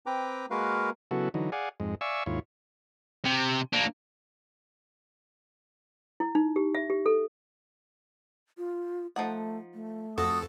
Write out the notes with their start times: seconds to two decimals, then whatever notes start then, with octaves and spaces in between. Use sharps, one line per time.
0.06 C4 B4 G5 A#5 D6
0.51 G#3 A#3 F#4 A#4 B4 F5
1.11 C#3 F#3 B3 E4 F#4 A4
1.34 D3 E3 F#3 D#4
1.52 G#4 D5 F5 F#5 G#5
1.80 F2 G#2 G#3
2.01 D5 E5 F5 G#5 C#6 E6
2.26 D#2 G#2 E4 F4 C#5
3.25 C3
3.73 A#3 D4
6.20 E4
6.35 D#4
6.56 G4
6.75 E5
6.90 G4
7.06 A4
8.58 F4
9.16 F3 A3 D#4 F#5
9.74 A3
10.18 F2 F#4 A4 D#6